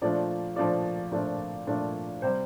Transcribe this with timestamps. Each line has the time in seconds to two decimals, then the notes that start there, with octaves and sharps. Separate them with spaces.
0.02 A#2 F3 A3 D4 F4 D5
0.56 A#2 F3 A3 D4 F4 D5
1.12 A#2 F3 A3 D4 F4
1.67 A#2 F3 A3 D4 F4
2.22 C3 G3 C5